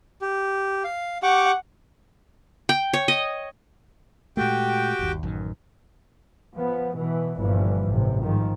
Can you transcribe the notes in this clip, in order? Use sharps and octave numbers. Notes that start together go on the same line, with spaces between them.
G4
F5
G4 F#5 C#6 D6
G5
C#5
D#5
A#2 G#3 A3 F#4 G4 G5
G1 D#2
A1 F#2 D#3
F3 B3
B2 E3
G1 G2 A#2 E3 F3
A1 C3
G#2 D#3 F3